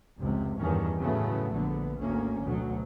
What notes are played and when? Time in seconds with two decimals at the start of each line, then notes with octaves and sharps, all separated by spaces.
0.19 F1 C#2 C3
0.58 E2 G2 D#3 C#4
1.00 A2 C#3 F#3 A3 B3
1.53 A#1 D3 B3
2.00 G#1 D2 A#3 C#4
2.45 D2 B2 F#3